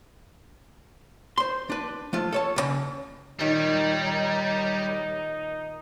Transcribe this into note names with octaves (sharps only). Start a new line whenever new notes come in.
C5 C6
D4 B4
F3 A3 F4
A4 C#5 A5
B1 C#3
A#2 D#3 G3 D#4 C#5 A#5